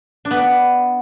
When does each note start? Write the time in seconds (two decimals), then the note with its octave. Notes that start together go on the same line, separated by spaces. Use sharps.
0.25 D4
0.31 B3
0.36 D5